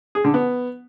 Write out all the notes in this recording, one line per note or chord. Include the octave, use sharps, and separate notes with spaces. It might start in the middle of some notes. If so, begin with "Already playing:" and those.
G#4
D3
B3